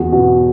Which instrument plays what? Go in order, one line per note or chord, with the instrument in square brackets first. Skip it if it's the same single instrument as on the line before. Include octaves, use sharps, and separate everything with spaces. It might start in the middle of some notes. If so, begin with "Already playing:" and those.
Already playing: [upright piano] E2 F#4
B2 F#4